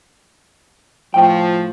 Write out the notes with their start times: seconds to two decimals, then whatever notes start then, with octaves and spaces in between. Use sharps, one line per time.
1.14 A2 F3 G5